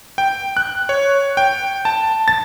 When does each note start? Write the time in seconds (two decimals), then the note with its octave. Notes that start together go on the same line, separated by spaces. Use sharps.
0.18 G5
0.57 F#6
0.89 C#5
1.37 G5
1.85 A5
2.28 A6